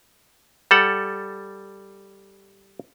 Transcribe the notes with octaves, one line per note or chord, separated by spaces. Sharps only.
G3 A4 F#5